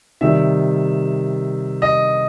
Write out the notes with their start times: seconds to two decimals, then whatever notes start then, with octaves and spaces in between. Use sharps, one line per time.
0.21 C3 D#3 G3 E5
1.82 D#5